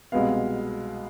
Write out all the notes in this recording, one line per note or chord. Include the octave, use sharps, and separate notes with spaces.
C2 B2 G#3 B3 F5